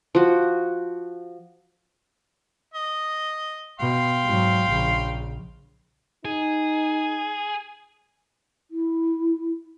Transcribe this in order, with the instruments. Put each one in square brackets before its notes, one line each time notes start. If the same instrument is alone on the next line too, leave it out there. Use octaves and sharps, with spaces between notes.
[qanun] F3 F#4
[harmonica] D#5
[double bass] B2 [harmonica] F5 G5 C6
[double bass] G#2 F#3
A#1 C#3
[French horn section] D#4 [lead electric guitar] G#4
[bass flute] E4